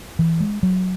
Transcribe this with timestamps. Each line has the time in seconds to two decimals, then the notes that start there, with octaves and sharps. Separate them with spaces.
0.19 E3
0.40 G#3
0.63 F#3